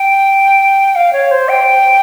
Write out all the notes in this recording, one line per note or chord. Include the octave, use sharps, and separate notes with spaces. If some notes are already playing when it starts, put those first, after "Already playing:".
Already playing: G5
F5
C#5
C5
G5